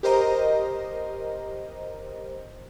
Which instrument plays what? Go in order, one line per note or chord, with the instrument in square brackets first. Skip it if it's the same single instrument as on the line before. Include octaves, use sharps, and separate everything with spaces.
[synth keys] G4 A#4 C5 D#5 A#5